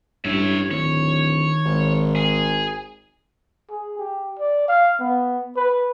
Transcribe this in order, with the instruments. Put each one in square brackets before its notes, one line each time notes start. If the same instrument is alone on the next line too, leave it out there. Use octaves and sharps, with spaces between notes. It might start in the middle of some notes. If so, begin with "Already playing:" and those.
[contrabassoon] A1 [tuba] G2 [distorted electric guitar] C#5 E5
[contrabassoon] D1 [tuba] D#3 [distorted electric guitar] C#5
[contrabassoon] G#1
[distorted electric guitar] G#4
[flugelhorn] G#4
G4
D5
F5
B3
B4